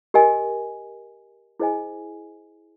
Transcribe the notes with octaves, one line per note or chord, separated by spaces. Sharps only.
G4 A#4 D#5 G#5
E4 G#4 C5 D#5 G#5